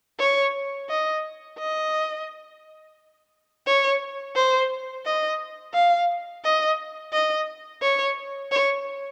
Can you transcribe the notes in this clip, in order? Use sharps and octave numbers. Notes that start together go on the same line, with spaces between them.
C#5
D#5
D#5
C#5
C5
D#5
F5
D#5
D#5
C#5
C#5